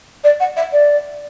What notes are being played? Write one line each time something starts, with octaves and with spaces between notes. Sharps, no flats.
D5
F#5
E5
D5